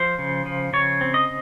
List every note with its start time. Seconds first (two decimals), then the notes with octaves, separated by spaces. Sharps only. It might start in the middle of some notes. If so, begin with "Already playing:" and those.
Already playing: F3 C5
0.19 C#3
0.46 F3
0.73 C#3 C#5
1.01 C4
1.14 D#5